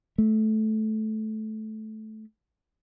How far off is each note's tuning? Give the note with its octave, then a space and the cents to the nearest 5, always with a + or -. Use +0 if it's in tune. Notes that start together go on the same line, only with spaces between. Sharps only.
A3 -15